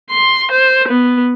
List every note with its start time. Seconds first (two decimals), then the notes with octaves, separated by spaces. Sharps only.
0.10 C6
0.52 C5
0.88 B3